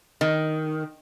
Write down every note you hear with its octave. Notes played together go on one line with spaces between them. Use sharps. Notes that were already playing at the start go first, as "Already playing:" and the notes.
D#3